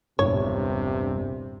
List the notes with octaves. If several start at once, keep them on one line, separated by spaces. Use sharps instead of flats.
E1 A#1 G2 C3 E4 C#5